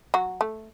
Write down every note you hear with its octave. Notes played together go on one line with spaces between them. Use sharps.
F#3 F#4
A3